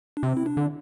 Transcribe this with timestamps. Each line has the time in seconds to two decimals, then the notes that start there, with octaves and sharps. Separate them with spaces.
0.17 D4
0.23 C3 C4
0.37 E4
0.46 D4
0.57 D3